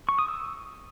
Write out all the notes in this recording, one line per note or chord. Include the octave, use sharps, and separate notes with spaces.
C#6
D#6
E6